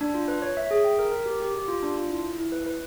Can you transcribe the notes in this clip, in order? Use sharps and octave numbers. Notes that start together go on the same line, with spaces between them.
D4
F4
B4
C#5
E5
G#4
G5
A#4
A#4
G4
G4
G4
F4
D4
F4
E4
E4
E4
B4
B4